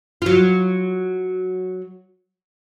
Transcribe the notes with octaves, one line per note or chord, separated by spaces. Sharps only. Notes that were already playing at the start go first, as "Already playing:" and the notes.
F#3 F4